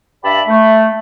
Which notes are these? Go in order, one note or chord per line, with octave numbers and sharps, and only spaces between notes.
G2 G4 D5 E5 A5 B5
A3